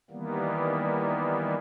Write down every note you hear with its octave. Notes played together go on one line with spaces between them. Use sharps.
D#3 E3 G3 A#3 B3